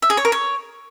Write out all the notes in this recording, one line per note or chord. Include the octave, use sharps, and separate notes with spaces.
E5
G#4
C#5
A#4
C#5